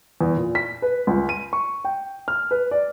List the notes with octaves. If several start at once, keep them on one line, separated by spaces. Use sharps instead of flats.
E2
A#2
B6
B4
C#2
D#7
C#6
G5
F6
B4
D5